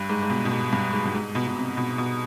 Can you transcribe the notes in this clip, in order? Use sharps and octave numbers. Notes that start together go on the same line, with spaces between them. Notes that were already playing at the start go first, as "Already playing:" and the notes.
Already playing: G2
G#2
G#2
B2
B2
G#2
G2
G#2
G2
G#2
B2
B2
C3
B2
B2